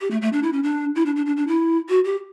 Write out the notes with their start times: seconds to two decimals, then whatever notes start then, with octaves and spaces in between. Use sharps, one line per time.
0.01 G4
0.11 A3
0.22 A3
0.33 D4
0.43 E4
0.53 C#4
0.63 D4
0.95 E4
1.06 D4
1.16 D4
1.26 D4
1.37 D4
1.48 E4
1.89 F#4
2.05 G4